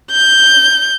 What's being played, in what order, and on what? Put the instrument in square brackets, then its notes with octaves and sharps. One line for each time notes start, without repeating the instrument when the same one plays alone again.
[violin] G6